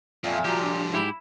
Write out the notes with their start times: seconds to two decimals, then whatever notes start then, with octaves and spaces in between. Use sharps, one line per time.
0.24 F2 A#2 F3 E5 F5 G#5
0.45 F3 G3 F#4 G4 A#5
0.61 D4 F4 D6
0.93 G#2 E4 G4 B5